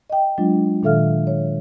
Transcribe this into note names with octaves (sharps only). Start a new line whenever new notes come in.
D#5 G5
F#3 G#3 D4 F4
A#2 D#3 A4 E5 F5 F6
C#5